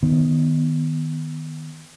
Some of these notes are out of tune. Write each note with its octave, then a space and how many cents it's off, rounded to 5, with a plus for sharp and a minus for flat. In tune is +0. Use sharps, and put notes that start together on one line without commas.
D#3 +0 B3 +0